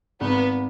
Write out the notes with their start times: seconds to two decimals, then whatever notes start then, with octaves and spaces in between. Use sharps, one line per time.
0.20 G#1 B3